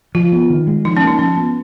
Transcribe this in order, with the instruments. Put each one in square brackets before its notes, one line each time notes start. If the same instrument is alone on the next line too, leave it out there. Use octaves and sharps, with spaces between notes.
[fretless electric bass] F3 [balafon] F4
[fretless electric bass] B3
D#3
G#3
[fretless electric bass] F3 [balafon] D#4
[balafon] C#4
[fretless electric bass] A#3 [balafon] D#4
[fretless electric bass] F3 [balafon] C#4
[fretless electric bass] B3